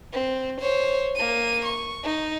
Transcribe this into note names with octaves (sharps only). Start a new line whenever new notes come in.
C4
C5 C#5
A#3 D#7
C#6
D#4